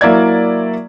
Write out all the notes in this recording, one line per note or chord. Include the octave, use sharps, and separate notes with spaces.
F#3 A#3 E4 D5 G#6